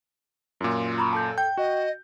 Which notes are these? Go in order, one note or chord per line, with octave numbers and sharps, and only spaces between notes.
F#2 A#2 F4
A#5 B5 C#6
A4 A5 G6
G5 G6
F#4 D#5